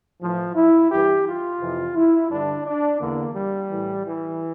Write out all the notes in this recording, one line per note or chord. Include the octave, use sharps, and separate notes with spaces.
A2 E3 F3
E4
G2 E3 G4
F4
F2 C3 E3
E4
G2 D3 D4
D4
E2 D3 A#3
G3
A2 E3
E3